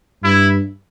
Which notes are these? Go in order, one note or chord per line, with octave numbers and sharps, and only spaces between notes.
G2 E4